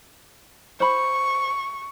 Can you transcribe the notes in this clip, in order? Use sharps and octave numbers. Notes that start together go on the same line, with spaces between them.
C5 B5 C#6